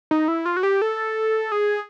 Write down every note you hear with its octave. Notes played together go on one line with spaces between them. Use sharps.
D#4
E4
F4
F#4
G4
A4
G#4